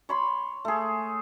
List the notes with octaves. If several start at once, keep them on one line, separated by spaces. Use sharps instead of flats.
C#5 B5 C6
A3 G#4